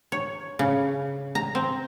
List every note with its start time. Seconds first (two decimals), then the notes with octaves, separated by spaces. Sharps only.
0.12 C#5
0.59 C#3
1.35 A#5
1.55 C4